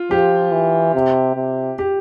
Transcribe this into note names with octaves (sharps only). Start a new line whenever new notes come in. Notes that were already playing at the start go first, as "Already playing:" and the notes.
Already playing: F4
F3 G4
E3
C3
C3
G4